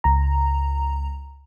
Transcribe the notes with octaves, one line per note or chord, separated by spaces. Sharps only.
C#2 A#5